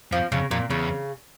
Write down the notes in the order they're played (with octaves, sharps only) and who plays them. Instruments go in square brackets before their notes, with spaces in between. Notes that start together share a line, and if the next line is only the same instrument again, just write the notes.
[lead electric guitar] F2 [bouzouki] F3
[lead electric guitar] F2 [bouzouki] C#3
[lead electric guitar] F2 [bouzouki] A#2
[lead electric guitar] E2 [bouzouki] C#3